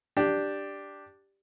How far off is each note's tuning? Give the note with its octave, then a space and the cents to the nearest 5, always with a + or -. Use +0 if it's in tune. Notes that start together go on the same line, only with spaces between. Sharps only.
D4 +0 G4 +0